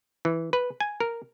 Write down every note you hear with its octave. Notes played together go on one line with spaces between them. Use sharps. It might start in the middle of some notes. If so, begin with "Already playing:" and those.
E3
B4
G#5
A#4